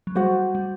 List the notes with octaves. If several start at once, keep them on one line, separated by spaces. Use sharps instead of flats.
F#3
G3 F#4 C5 F#5
G3